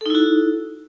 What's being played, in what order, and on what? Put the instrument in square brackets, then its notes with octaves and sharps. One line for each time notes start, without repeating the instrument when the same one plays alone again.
[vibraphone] A4
D#4
E4
F#4